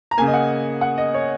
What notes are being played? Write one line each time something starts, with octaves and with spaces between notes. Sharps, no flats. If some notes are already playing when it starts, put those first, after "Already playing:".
A#5
C#3 A#3 G#5
D#5
F#5
F#5
D#5
C#5